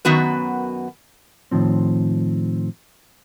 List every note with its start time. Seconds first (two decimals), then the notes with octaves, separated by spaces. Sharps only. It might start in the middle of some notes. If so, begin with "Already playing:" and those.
0.05 F#2 D#3 B3 F#4 B4
1.51 A2 D#3 F3 C4